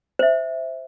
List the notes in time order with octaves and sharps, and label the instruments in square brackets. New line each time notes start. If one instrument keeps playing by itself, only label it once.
[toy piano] C5 E5